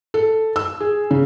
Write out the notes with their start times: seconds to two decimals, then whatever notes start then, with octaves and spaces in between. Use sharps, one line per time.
0.14 A4
0.56 E6
0.80 G#4
1.11 C#3